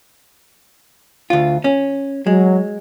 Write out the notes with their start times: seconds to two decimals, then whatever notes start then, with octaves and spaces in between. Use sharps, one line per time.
1.30 D2 F4
1.64 C#4
2.27 F#3 G#3